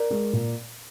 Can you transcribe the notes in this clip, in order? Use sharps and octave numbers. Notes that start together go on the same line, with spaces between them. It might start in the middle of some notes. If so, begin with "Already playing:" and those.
Already playing: A#4 D5
G#3
A#2